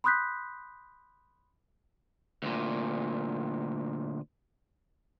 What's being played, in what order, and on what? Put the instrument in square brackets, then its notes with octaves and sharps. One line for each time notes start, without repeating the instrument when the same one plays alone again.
[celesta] B5 C6 D#6 F#6 G6 B6
[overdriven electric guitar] D2 A#2